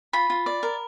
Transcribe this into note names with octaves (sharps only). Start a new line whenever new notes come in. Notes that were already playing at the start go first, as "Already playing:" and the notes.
F4 B5
F4
D5
A#4